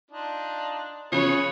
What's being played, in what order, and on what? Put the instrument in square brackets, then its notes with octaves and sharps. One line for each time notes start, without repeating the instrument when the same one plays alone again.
[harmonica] D4 D#4 F4
[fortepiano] C#3 F3 C#4 [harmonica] G#4 B4 [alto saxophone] C#5